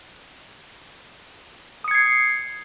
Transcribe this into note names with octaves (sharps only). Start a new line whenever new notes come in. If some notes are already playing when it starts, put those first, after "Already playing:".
D#6 G#6 C7 C#7